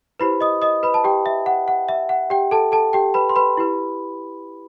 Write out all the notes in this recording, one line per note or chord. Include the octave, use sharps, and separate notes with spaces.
E4 G4 B4 C5 B5
D#5 D#6
D#5 D#6
B4 B5
A5
G4 G5
E5
F#5
F#5
E5
F#5
G4 G5
A4 A5
A4 A5
G4 G5
B4 B5
C6
B4 B5
E4 G4 B4